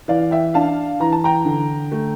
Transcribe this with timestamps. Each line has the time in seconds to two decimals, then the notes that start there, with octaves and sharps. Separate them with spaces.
0.08 E3 D5 F5
0.31 E5 G5
0.54 D4 F5 A5
1.00 E3 A#5
1.12 A5
1.24 G5 A#5
1.45 D3
1.92 A3